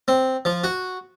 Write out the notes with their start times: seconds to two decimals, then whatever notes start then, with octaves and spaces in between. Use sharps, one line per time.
0.08 C4
0.45 F3
0.64 F#4